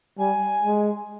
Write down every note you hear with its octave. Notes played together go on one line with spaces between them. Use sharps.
G3 G#5
G#3